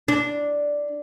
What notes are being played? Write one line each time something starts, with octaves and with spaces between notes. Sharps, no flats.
D4